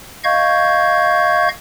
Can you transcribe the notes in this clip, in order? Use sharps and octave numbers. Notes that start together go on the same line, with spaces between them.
D#5 F5 C#6 G6 G#6